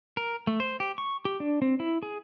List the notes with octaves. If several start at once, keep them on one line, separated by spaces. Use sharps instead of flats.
A#4
A3
C5
G4
C#6
G4
D4
C4
E4
G#4